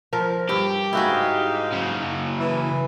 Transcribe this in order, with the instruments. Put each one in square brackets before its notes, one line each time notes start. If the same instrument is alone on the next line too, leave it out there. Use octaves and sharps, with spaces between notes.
[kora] F3 A#4
[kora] G2 [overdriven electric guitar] G4
[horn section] G#2 D#4 F5 [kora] E4 F#4 G#4
[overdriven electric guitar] C#3 F#3
[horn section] E3